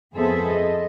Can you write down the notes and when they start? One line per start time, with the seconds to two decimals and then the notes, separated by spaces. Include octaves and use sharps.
0.14 F2 B3 G#4 A4 C5 E5
0.49 D#5